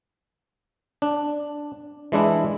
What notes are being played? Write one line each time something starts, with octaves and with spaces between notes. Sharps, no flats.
D4
E3 G#3 D4 E4